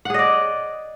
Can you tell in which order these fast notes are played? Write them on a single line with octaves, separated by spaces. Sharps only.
F#5 G#4 D#5 D5